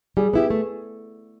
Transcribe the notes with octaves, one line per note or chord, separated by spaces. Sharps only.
G3 G#4
B3 E4 G4
A3